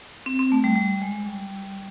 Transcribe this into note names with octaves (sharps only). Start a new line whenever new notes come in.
C4
C4
A3
G3
G3
G#3
G3